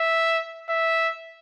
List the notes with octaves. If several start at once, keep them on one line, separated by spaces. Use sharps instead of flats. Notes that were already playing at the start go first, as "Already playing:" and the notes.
Already playing: E5
E5